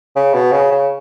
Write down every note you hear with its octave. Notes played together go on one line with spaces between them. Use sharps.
C#3
B2
C#3
C#3